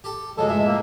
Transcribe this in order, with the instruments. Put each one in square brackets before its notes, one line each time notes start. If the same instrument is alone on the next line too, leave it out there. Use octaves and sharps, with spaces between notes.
[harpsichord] G4 A4
[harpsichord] C#2 F#2 C#3 [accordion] G#3 [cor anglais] A4
[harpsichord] C#2 A2 [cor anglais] E5
[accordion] A#3